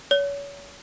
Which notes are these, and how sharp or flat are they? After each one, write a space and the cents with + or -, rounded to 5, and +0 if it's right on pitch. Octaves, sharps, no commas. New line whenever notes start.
C#5 +35